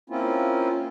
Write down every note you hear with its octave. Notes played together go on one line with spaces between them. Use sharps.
A#3 C4 C#4 E4 F4